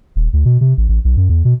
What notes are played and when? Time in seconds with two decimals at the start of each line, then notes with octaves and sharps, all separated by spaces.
0.16 D#1
0.33 D2
0.45 B2
0.61 C3
0.77 A1
0.89 A1
1.05 B1
1.17 F#2
1.29 E2
1.45 B2